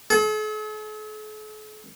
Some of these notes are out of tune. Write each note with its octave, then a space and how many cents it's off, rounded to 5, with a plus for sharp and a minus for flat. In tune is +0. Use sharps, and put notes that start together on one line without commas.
A4 -45